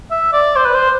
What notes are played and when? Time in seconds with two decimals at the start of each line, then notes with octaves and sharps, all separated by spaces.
0.11 E5
0.33 D5
0.56 C5
0.65 B4
0.75 C5